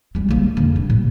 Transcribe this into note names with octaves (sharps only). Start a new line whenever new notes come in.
G3 B3
C#3 A#3
F2 D3
C3
A2